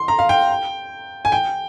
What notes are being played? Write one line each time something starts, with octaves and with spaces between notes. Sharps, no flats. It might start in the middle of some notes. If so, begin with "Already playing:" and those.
Already playing: C6
A#5
F5
G5
G#5
G5